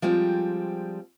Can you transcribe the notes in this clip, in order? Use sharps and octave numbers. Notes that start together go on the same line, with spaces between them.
F3 G3 G#3 C4